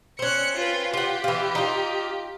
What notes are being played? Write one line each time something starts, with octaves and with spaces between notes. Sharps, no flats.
C4 C#4 F#6 C#7
F4 B4
F4 G4 F#5
E3 F4
D#4 F4